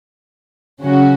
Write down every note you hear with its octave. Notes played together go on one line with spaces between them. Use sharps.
C#3 F#3 C#4 F#4